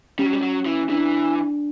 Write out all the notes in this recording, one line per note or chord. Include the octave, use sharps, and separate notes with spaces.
G3 C#4
F#3
G3
F#3
E3
E3 D4